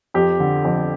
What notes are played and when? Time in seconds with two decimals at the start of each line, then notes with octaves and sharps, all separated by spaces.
0.14 F2 G4
0.40 D3
0.65 F2